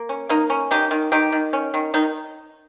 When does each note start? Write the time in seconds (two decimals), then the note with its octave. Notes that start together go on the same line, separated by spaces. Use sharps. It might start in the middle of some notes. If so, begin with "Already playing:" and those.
Already playing: A#3
0.09 C#4
0.29 A#3 D#4
0.50 C#4
0.71 D#3 D#4 G4
0.91 D#3
1.12 D#3 D#4 G4
1.32 D#3
1.53 C#4
1.74 D#3
1.94 D#3 D#4